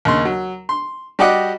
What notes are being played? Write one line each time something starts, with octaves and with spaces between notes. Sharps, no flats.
D#2 C#3 C6
F#3
C6
G3 F#4 G4 D5 D#5 F#5